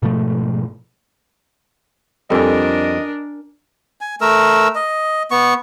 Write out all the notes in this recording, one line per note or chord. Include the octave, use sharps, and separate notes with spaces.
G#2 B2 F3 A3
F2 G3 D4 A4 A#4 D#5 G#5
G#5
A3 A#4 E6
D#5
B3 C#6